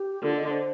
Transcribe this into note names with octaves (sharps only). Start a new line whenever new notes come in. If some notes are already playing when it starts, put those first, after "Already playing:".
Already playing: G4
D3 F4
D#5
C5